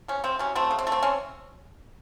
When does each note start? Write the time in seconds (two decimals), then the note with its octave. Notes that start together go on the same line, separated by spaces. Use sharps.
0.08 C3 C#4
0.24 C3 C4
0.39 F#3 C#4
0.55 A3 C4
0.71 C#3
0.79 C4
0.87 A3
0.92 C4
1.02 C4 C#4